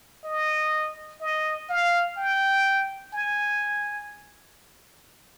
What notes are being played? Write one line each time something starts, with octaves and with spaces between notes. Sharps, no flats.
D#5
D#5
F5
G5
G#5